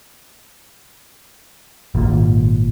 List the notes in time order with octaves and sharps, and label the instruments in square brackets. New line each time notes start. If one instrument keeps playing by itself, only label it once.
[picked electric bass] G#1 A#2